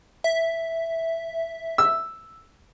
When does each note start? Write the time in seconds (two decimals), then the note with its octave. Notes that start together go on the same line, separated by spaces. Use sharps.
0.24 E5
1.78 E6